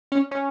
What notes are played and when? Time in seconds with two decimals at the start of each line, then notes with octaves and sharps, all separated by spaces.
0.12 C#4
0.31 C#4